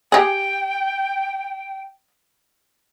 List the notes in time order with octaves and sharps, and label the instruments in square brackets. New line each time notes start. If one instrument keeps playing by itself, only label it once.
[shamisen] G4 G#4 [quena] G5